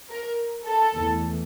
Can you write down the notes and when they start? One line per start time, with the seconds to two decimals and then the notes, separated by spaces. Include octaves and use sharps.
0.10 A#4
0.67 A4
0.95 E2 E3 A3